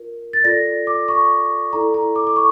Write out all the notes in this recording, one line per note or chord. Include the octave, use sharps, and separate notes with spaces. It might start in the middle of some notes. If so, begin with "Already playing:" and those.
Already playing: F4 A#4
A6
F4 A4 D5 A#6
D6
C#6
E4 A4 D5 A#5
A#5
D6
D6
C#6